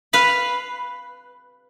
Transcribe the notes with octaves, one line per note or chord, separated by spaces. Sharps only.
B4 F5 B5